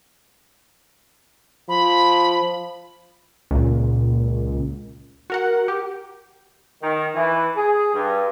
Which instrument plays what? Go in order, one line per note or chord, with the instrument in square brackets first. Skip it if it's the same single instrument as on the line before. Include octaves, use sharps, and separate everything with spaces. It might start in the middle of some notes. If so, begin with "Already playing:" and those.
[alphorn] F3 [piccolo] B5
[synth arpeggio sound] C#2 A#2
F#4 A#4 F#5
G4
[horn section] D#3
E3
G#4
G2